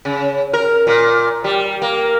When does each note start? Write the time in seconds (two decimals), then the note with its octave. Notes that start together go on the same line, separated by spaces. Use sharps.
0.05 C#3
0.53 A#4
0.87 A#2
1.44 G3
1.82 A#3